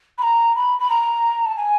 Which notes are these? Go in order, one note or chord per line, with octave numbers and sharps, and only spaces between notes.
B5
A#5
B5
B5
A#5
A5
G#5